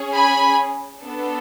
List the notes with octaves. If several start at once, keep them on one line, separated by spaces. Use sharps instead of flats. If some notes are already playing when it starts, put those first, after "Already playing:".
Already playing: C#4 G#4
G#5 B5
B3 D4 A4